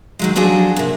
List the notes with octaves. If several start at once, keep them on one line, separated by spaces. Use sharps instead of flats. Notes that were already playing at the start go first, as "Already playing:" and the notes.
D#3 F#3 G#3
F3 F#3 D4 F#4 G#4 A4
C3 A#3